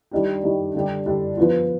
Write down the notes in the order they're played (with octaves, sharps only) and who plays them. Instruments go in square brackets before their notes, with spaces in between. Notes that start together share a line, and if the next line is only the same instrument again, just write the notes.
[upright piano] D#3 G3 D4 G4
D#3 G3 D4 G4
D3 G3 D4 G4
D3 G3 D4 G4
F3 B3 F4